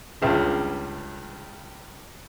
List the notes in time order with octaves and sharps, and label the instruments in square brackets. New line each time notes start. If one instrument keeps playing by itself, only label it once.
[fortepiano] C#2 G2 C#3